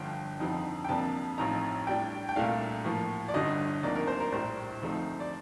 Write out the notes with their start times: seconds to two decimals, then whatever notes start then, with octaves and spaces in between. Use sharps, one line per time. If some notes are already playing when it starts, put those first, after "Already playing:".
Already playing: G1 G2 D3 F3 G5
0.40 F2 D3 F3 C4 D#4
0.85 G5
0.88 F2 C3 F3 A#3 D4 A5
1.38 A1 A2 F3 C4 D#4 A#5
1.87 A2 G3 D4 G5
2.29 G5
2.36 C2 A#2 A3 D4 F5
2.85 A2 F3 A#3
3.28 D5
3.34 G1 G2 D3 G3 D#5
3.83 D2 C3 F3 A#3 D#4 D5
3.95 A#4
4.07 C5
4.20 A#4
4.32 A#1 A2 G3 C5
4.81 D2 C3 F3 A3 D#4
5.20 D5